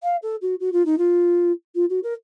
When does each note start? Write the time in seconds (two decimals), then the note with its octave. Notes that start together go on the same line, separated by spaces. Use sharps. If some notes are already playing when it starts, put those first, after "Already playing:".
0.03 F5
0.22 A4
0.41 F#4
0.60 F#4
0.72 F4
0.85 D#4
0.98 F4
1.75 F4
1.89 F#4
2.03 A#4